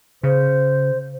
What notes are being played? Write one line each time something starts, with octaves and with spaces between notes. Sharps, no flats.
C#3 C5